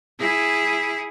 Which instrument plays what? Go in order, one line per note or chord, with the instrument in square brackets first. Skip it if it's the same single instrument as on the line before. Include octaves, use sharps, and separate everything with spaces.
[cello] E4 G#4